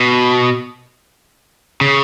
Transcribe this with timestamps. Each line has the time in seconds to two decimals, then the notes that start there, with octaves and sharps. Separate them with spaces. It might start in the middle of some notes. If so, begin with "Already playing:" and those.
Already playing: B2
1.81 C#3